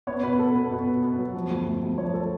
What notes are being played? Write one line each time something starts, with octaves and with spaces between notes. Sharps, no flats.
B3 C#5
B2 B4
B3 A4
B3 B4
B2
B3
B3
F#3
F3
D2
D2
D2
F3 C#5
A4